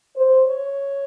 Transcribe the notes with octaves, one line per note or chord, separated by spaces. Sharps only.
C5
C#5